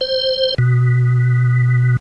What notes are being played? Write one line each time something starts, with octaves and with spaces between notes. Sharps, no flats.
C5
B2